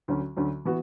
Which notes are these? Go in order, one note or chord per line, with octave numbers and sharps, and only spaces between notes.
D2 D3 F#3 C#4
D2 D3 F#3 C#4
E3 B3 F#4